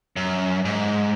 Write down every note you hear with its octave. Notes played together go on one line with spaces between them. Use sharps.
F#2
G#2